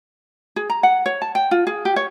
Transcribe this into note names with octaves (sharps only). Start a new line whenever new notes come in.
G#4
A#5
F#5
C#5
A5
G5
F4
G#4
G4
C#5